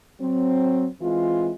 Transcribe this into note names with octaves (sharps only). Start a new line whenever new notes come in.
F#3 C4
E3 G#3 C4 F4